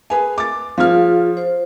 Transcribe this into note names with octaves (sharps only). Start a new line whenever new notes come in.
G#4 B4 G#5
D6 A6
F3 F4 G#4 F5 F6
C5